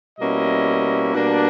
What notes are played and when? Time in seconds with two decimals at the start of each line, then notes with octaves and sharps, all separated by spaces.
0.19 B2 G3 A#3 C#4 E4 D#5
1.14 B2 G3 A#3 D4